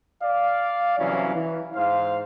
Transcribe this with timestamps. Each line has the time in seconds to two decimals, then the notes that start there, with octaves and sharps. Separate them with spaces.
0.22 D5 F5
0.98 C2 E3 F#3 C#4 F5
1.34 E3
1.75 G#2 C5 F5